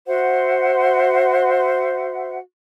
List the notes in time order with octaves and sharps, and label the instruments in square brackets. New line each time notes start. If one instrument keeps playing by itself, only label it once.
[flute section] F#4 C5 E5 F#5